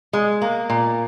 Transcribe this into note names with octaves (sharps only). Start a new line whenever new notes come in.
G#3
A#3
A#2